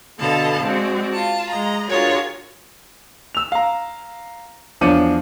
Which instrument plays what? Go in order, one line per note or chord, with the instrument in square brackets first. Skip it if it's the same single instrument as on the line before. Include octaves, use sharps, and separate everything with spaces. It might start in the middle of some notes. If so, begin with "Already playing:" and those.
[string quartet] B2 D3 A4 D#5 F5 A5
G#3 C4 F#4 D5
F4 A5
G#3 D#5 A#5
D4 F4 F#4 G#4 A#4 C#5
[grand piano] E6 F7
F5 A#5
E2 F3 D4 C#5 C#7 D#7